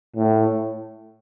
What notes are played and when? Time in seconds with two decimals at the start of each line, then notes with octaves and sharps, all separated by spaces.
0.16 A2